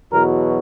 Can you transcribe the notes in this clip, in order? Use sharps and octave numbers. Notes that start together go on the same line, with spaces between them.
E2 B2 F#3 A#4